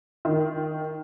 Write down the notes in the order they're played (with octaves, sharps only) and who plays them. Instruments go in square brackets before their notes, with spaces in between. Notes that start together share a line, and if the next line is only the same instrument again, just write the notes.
[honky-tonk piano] D#3